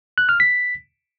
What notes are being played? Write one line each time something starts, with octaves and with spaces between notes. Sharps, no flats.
F#6
F6
B6